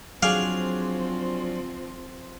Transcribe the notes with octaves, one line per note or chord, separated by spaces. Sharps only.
F3 F#3 C4 D4 G#4 F5